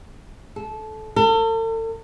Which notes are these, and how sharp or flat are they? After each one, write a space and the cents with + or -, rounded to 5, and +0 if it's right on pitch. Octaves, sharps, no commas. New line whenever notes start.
A4 -20
A4 +40